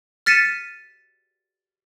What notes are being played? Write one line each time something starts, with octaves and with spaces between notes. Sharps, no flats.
F6 A6 B6 C#7 D#7 E7